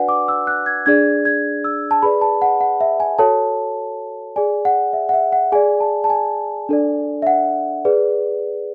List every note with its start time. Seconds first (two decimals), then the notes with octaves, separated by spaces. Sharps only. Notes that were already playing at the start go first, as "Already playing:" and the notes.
Already playing: D4 F#4 B4 D5 F#5 G#5
0.09 D6
0.28 E6
0.47 F#6
0.66 G#6
0.86 D4 G#4 D5 G#6
1.25 G#6
1.64 E6
1.91 A5
2.03 G#4 B4 D5 B5
2.21 A5
2.42 F#5
2.61 F#5
2.81 E5
3.00 G#5
3.18 F#4 A4 C#5 A5
4.36 G#4 D5 G#5
4.65 F#5
4.93 E5
5.09 F#5
5.14 E5
5.32 F#5
5.52 G#4 D5 G#5
5.80 A5
6.04 A5
6.10 G#5
6.69 D4 A4 D5
7.22 E5
7.27 F#5
7.85 G#4 B4 D5